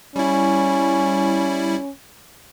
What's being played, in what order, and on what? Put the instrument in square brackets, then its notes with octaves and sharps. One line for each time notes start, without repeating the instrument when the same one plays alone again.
[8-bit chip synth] G3 E4 [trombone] C#4